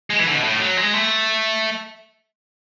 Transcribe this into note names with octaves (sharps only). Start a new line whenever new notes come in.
G#3
E3
D3
B2
A2
F#3
G#3
A3